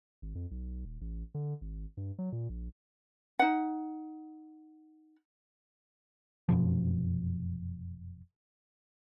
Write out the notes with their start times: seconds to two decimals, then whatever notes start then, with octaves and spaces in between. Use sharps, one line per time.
0.22 G#1
0.35 F2
0.51 B1
0.85 D#1
1.01 A1
1.34 D3
1.61 G#1
1.97 G2
2.19 F#3
2.32 A#2
2.49 A#1
3.39 D#4 F#5
6.49 F1 F#2 B2 F3